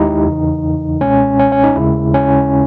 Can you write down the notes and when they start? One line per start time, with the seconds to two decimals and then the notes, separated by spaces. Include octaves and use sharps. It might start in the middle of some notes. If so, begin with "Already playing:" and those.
Already playing: D#2 D#3 G#3 D#4 E4 G4
0.26 E2 C#3 E3
1.01 C#2 B2 G#3 C#4
1.39 C#4
1.52 C#4
1.64 D#4
1.76 D#2 C#3 G#3 E4
2.14 C#4